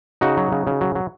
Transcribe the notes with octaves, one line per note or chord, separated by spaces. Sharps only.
C#3 D#4 F#4
F#3
C#3
C#3
F#3
F#3